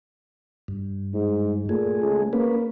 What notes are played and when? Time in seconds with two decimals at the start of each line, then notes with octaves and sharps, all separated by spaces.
0.68 G2
1.14 G#2
1.69 A#2 A3 G#4
2.02 C#2
2.33 A#3 C#4 B4